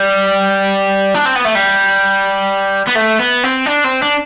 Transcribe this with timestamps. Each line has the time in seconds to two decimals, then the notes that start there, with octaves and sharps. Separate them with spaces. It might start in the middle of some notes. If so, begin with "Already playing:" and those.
Already playing: G3
1.14 D4
1.25 C4
1.35 B3
1.45 A3
1.55 G3
2.88 B3
2.96 A3
3.20 B3
3.44 C4
3.66 D4
3.84 C4
4.02 D4